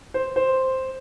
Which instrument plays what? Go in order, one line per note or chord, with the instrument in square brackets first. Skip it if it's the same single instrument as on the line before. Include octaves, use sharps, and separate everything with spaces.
[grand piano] C5
C5